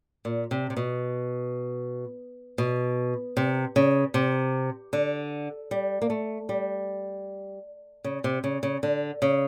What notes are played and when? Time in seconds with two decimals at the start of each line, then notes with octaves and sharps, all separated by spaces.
0.25 A#2
0.51 C3
0.70 C3
0.77 B2
2.58 B2
3.37 C3
3.76 C#3
4.14 C3
4.93 D3
5.71 G3
6.02 A#3
6.10 A3
6.49 G3
8.04 C#3
8.24 C3
8.44 C#3
8.63 C#3
8.83 D3
9.22 C#3